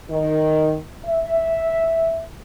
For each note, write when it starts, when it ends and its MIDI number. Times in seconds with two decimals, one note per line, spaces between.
0.10 0.77 51
1.06 2.23 76